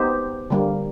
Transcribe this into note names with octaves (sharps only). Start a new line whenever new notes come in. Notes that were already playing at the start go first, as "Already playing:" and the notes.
Already playing: B3 D#4 G4 C5
D3 G3 A#3